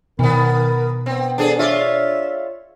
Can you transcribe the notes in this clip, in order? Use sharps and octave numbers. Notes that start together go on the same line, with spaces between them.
B2 D#3 B3 A#4
B3 C4
D4 G#4 A4
F4 C#5 D5 E5